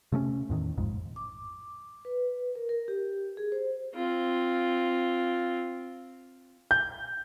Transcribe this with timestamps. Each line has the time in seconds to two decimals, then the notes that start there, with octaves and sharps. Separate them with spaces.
0.12 C3 A3 B3 C#4
0.50 E2 A2 D#3
0.77 A#1 F2 G#2
1.16 D6
2.05 B4
2.55 A#4
2.69 A#4
2.88 G4
3.37 G#4
3.52 C5
3.95 C4 F4
6.71 G6